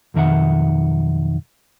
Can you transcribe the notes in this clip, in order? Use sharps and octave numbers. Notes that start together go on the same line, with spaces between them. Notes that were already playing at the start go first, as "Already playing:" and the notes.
B1 F2 D#3 E5 F#5